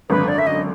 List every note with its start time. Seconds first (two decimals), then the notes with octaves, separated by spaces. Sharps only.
0.09 G#1 F#2 D3 B4
0.28 D5
0.38 E5
0.46 D#5